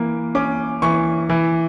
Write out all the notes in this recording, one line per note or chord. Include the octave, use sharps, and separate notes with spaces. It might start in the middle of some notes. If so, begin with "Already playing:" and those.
Already playing: E3 A#3
C#4 D6
E3 C#6
E3